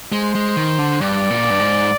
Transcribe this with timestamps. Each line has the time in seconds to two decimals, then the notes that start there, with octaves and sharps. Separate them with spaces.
0.12 G#3 C5
0.35 G#3
0.57 D#3
0.78 D3
1.01 G2 D5
1.30 A#2
1.50 G2
1.59 G#2